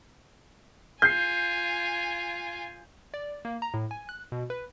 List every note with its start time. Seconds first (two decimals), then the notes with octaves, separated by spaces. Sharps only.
1.02 F4 G#5 G6 C7
3.14 D5
3.45 A#3
3.62 A#5
3.74 A2
3.91 G#5
4.09 F#6
4.32 B2
4.50 B4